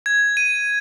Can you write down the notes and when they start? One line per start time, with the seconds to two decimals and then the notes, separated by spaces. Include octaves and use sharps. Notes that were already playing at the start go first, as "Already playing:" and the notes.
0.06 G#6
0.37 D#7